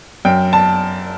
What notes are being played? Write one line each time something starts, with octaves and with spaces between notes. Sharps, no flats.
F#2 G5
A5